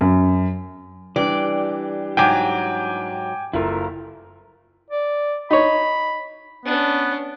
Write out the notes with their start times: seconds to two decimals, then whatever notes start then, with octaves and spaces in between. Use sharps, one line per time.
0.01 F#2
1.16 E3 G3 D4 G4 D5
2.17 G#2 F#3 G5 G#5 D6
3.53 F#1 E4 F4 A4 A#4
4.90 D5
5.50 D#4 C#5 B5
6.65 B3 C#4 D4